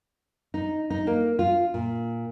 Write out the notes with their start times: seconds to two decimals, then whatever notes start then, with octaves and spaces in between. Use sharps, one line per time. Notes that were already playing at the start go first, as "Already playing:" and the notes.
0.54 D#4
0.90 D#4
1.07 A#3
1.39 F4
1.74 A#2